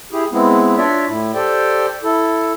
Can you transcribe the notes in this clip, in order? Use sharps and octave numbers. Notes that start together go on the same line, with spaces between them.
E4 G4 G#4
G#3 B3 C4 E4
D4 F4 C#5 D5 E5
A2 E4
G4 A4 C5 D5 G5
E4 A4